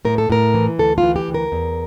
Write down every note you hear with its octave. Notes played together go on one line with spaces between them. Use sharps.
A2 A#4
A4
A2 A#4
E3
D2 A4
F4
E3
G4
D2
A#4
E2